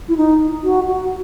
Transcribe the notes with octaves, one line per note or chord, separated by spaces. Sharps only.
E4
D#4
F#4
F#4